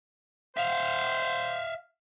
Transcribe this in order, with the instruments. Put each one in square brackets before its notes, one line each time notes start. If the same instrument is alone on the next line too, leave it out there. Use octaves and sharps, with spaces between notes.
[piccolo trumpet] C5 [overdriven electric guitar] E5 F5